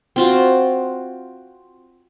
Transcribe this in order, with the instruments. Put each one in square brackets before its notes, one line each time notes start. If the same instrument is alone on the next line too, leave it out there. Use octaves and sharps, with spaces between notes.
[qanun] C4 F4 F#4